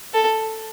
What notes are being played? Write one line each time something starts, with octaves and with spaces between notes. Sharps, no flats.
A4